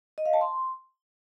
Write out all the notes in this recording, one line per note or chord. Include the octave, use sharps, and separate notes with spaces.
D#5
F5
A5
C6